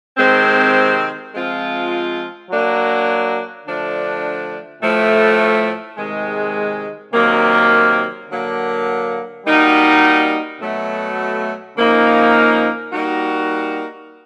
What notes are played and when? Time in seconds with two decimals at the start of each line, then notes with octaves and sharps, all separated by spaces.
0.17 C3 D#3 G#3 C4
1.34 F3 G#3 C4 F4
2.49 F#3 A#3 D4
3.65 D3 F3 A3 D4
4.81 A2 F3 A3
5.97 C3 D#3 G#3
7.13 C3 D#3 F#3 A#3
8.29 D3 F#3 A#3
9.45 G3 A#3 D#4 F#4
10.61 B2 F#3 A3
11.76 C#3 F3 A#3 D#4
12.92 G3 A#3 D#4 F#4